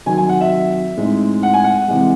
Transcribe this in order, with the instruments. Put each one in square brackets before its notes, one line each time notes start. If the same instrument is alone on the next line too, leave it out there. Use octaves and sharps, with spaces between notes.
[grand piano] C3 D#3 F#3 C4 G#5
G#5
F#5
E5
A2 G#3 C4 D#4
F#5
G#5
F#5
C3 E3 G#3